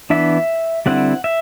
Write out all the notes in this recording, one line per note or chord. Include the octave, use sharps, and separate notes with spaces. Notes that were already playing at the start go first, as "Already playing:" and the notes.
E3 B3 D4 E5
D3 G3 C4 E4 F#5
E5